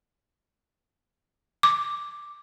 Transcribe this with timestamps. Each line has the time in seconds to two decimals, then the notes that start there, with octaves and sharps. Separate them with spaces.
1.63 D6